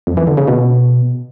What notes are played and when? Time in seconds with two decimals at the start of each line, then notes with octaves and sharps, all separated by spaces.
0.07 F2
0.17 E3
0.27 D3
0.37 C#3
0.48 B2